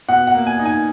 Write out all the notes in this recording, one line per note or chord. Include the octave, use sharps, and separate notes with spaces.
B2 F#5
F#5
A#3
G#5
D#4
G#5